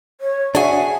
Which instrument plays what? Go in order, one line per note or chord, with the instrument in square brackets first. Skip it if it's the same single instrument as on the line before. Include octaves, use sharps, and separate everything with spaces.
[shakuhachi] C#5
[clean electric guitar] D4 F#4 [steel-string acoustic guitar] G#4 G#5 [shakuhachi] E5